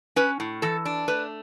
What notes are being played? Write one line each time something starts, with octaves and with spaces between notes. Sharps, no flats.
C#4 B4
A2
E3 A4
D4
A3 B4